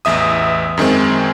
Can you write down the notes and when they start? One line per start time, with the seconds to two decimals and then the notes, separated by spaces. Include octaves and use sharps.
0.05 A1 E2 E5 D#6
0.77 F#2 D#3 G#3 C4